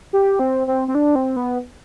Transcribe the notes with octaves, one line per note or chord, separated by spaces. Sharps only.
G4
C4
C4
C4
D4
C4
B3